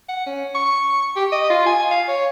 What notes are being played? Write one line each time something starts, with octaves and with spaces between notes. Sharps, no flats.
F#5
C#4
C#6
G4
D#5
F4
G#5
F5
C#5